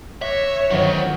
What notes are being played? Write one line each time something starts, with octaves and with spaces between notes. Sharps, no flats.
C#5 E5 D6 F#6 A#6
G1 D#3 F#3 F#4 C5